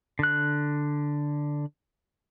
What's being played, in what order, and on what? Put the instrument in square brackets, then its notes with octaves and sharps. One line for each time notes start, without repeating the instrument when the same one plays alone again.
[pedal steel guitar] D3 F#6